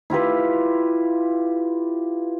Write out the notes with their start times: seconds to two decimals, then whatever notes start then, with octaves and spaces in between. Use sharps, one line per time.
0.10 E4 F4 G4 B4